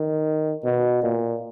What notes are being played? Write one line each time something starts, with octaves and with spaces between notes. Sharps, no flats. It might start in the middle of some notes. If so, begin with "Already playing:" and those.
Already playing: D#3
B2
A#2